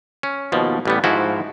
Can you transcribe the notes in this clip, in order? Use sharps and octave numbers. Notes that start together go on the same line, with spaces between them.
C#4
D#2 B2 F3
A1 G3 B3
G#2 F3 E4 F#4